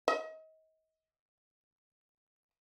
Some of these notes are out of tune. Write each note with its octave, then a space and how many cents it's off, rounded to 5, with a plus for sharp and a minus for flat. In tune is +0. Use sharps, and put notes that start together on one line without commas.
D#5 +35